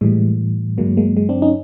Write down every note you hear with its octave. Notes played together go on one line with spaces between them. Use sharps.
A2 E3 G3 G#3
G2 D3 F#3 G#3 A#3
G#3 A#3
G#3
C4 D4
C#4 D#4